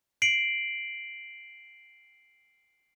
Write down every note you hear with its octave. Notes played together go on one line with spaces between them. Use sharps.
C7 D7 F#7